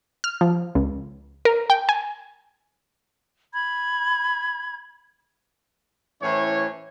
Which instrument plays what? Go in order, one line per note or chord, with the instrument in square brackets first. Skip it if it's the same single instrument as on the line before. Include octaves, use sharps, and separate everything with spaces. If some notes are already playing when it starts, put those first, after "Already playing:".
[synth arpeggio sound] F6
F3
C#2
A#4
G5
G#5
[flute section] B5 G#6
[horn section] A2 E3 C#4 C5 C#5